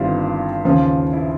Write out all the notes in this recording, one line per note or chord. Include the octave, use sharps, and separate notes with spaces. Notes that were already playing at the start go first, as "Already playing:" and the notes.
Already playing: G1 G2 D#3 G3 C4 E4 F4
D#2 C#3 F3
E4